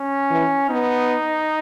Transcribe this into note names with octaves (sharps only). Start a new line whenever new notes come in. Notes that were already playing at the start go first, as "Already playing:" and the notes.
Already playing: C#4
E3
B3 D#4